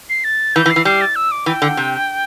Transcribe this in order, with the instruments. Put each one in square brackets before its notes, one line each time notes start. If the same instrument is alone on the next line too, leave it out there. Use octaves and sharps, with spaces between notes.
[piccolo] C7
A6
[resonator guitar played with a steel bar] E3 [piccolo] G6
[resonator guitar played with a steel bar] E3
[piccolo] C7
[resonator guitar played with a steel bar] E3
[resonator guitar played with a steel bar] G3 [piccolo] C7
[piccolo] A6
E6
D6
[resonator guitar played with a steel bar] E3 [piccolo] G5
[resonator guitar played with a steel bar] D3
C3